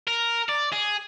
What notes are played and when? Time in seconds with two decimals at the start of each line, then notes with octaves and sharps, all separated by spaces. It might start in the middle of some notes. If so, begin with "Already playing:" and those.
0.08 A#4
0.49 D5
0.72 G#4